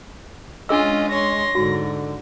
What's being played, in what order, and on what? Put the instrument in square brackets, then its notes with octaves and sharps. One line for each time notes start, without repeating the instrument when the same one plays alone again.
[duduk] G#3 [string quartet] C#4 F4 [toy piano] D4 G#4 E6 [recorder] D#5
[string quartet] C#5 C6 [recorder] A#6
[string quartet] G#2 [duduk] D3 [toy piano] F#4